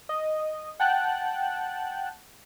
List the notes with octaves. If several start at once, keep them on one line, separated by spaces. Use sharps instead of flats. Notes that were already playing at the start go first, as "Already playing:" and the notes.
D#5
F#5 G5 A5 F#6